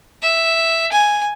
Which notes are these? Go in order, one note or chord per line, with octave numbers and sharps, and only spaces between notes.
E5
G#5